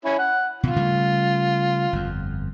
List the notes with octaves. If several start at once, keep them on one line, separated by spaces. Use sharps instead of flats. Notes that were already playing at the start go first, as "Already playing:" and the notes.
C#4 E4
F#5
B2 D3 F4
C#3 G3 A3
G1 F2